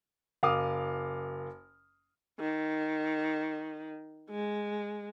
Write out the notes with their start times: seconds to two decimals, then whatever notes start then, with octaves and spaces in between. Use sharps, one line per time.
0.43 F#1 F5 D6 D#6 F6
2.40 D#3
4.30 G#3